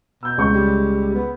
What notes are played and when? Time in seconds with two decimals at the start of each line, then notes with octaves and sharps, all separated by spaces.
0.23 B2 E6 G6
0.38 C#2 C#6 G6
0.54 G3
1.14 B3